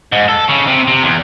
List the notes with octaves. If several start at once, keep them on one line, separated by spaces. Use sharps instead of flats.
G#2
A4
C#3
C3
C3
E2